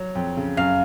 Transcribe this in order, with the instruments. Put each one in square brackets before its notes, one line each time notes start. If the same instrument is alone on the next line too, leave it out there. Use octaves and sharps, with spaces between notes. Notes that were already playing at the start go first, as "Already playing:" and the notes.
Already playing: [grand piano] F#3
F2
C#3
[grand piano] F#2 [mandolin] F5